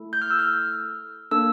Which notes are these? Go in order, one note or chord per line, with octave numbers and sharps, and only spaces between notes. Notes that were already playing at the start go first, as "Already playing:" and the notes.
Already playing: A3 E4 A4
G6
F6
E6
F6
A#3 D4 A4 E6